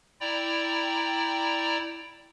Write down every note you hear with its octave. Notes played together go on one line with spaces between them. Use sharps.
E4 D5 G5 A#5